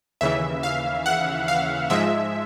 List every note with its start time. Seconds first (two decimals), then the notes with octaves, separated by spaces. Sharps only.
0.21 D#2 C#3 E3 E5
0.63 F5
1.06 F#5
1.48 F5
1.90 G#2 F3 G#3 E5